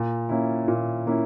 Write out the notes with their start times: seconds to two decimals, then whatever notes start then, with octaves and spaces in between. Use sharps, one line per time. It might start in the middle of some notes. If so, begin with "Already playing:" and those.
Already playing: A#2
0.29 A#3 C#4 E4
0.68 A#2
1.07 A#3 C#4 E4